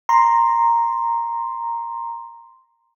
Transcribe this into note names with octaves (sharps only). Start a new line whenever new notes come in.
A#5 C6